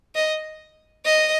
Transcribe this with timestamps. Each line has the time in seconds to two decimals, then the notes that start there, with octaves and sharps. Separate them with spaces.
0.15 D#5
1.05 D#5